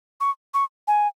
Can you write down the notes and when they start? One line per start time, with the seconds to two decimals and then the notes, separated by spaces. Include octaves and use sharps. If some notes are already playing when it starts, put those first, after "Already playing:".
0.21 C#6
0.54 C#6
0.88 G#5